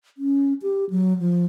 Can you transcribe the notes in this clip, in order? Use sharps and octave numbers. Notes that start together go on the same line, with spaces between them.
C#4
G4
F#3
F3